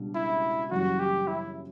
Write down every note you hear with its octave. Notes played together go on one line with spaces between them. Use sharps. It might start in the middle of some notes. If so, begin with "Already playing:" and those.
Already playing: C#2 B2 G3 D4 F#4
E4
F#1 F#2 E3 G3 F#4
G4
E4